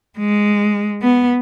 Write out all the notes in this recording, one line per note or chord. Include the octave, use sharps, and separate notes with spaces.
G#3
B3